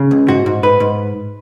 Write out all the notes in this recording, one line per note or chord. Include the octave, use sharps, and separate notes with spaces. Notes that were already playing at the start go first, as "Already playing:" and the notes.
Already playing: C#3
C#2
G#2 F#4
G#2
G#2 B4
G#2